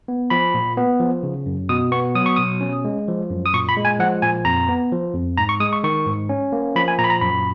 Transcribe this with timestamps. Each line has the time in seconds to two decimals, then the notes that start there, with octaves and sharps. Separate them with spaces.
0.08 B3
0.30 F3 B5
0.54 A#2
0.77 B3
1.00 F3
1.23 C#3
1.46 F#2
1.69 B2 D#6
1.92 B3 C#6
2.15 F#3 D#6
2.26 C#6
2.36 B2 D#6
2.61 C#4
2.85 G#3
3.08 F3
3.30 F#2
3.46 D#6
3.54 A#2 C#6
3.69 B5
3.77 G#3
3.85 G#5
3.99 F3 F#5
4.22 A#2 G#5
4.45 F2 A#5
4.69 B3
4.92 F3
5.14 F2
5.38 G#2 A#5
5.49 C#6
5.60 G#3 D#6
5.73 C#6
5.84 D#3 C#6
6.06 G#2
6.29 C#4
6.52 A#3
6.76 F3 B5
6.88 G#5
6.98 A#2 A#5
7.04 B5
7.10 A#5
7.21 F#2 B5